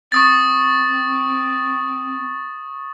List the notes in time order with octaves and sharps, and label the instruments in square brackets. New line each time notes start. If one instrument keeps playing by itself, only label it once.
[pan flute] C4 [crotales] C#6 D#6 A6